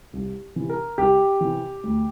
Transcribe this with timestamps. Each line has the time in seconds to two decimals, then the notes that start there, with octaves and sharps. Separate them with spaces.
0.13 C2
0.56 C3 E3
0.69 A#4
0.98 C2 G4
1.41 C3 E3
1.83 D2